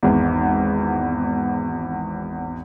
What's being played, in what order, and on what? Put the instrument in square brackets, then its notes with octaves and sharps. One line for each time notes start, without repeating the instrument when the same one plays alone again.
[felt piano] G#1 E2